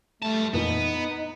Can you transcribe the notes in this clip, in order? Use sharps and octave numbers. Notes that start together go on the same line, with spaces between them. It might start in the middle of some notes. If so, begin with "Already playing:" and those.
G3 A3 A5
F2 A#2 E3 B3 D#4